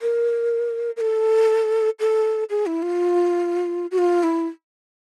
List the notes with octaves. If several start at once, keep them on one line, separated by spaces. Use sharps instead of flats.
A#4
A#4
A4
A4
G#4
E4
F4
F#4
F4
E4